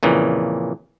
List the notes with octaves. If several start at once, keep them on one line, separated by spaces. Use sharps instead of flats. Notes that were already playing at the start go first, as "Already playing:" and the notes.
F2 A#2 C#3 E3